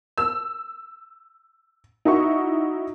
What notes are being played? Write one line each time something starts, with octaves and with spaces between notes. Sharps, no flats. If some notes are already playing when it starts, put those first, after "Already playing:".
E6
D#4 E4 F#4 C#6